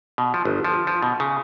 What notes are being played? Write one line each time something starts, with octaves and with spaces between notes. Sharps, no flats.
B2
F3
G1
F3
F3
B2
C#3